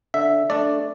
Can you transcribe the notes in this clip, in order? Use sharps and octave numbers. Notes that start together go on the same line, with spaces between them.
D3 E5
A3 D4 D5